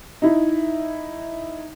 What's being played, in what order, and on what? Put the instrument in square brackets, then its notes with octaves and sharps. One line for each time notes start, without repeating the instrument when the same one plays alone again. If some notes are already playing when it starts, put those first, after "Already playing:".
[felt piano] D#4 E4